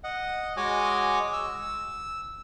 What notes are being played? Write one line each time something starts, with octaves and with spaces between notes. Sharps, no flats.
D#5 F#5
G#3 F#4 C#5 D#5 G#5 D6
E6